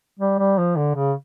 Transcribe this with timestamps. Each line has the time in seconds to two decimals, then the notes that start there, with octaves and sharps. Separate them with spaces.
0.20 G3
0.39 G3
0.58 F3
0.77 D3
0.96 C#3